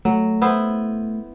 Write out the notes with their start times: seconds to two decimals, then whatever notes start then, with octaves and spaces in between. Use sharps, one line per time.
0.05 F#3 A3
0.42 B3 E4 C5